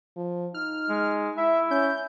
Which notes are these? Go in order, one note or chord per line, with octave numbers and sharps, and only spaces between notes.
F3
D#4 F6
G#3
E4 E5
C#4 G6